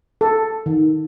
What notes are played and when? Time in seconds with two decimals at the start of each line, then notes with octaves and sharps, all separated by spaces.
0.21 A4
0.66 D#3